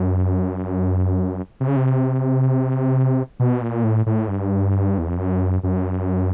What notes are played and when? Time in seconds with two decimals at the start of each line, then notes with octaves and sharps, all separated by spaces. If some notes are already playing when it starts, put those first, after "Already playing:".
Already playing: F#2
1.60 C3
1.68 C#3
1.76 C3
3.40 B2
3.62 A#2
3.84 A2
4.06 A2
4.28 G2
4.98 E2
5.08 F2
5.18 F#2
5.63 F#2